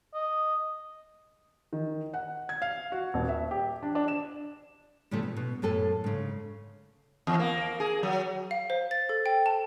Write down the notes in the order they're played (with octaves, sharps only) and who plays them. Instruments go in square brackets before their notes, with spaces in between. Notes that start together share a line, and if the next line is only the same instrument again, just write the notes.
[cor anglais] D#5
[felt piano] D#3
F#5
G#6
F5
F#4
D#1
E5
G4
D4
D4
E7
[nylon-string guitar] A2 C#3 F3 G3 A3
B2
B2
F#2 A2 A4 G#5
G#2 C#3
[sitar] E2
A#3
G#4
F#3
[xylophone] F5
C5
A6
A4
G5
A5